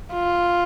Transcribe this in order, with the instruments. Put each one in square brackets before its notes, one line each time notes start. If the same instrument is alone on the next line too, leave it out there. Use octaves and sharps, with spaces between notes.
[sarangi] F4